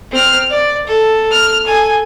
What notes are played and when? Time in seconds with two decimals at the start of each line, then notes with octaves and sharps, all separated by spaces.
0.11 C4 F6
0.50 D5
0.87 A4
1.31 F6
1.66 A4 G#5